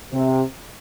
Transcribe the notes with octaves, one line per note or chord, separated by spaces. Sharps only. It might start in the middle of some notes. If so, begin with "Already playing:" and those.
C3